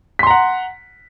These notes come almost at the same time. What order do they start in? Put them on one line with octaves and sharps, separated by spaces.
B6 C6 A#5 F#5